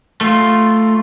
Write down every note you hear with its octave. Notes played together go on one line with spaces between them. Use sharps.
A3 F4